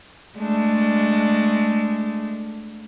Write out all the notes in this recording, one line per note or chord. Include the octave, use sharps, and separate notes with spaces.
G#3 A3 D4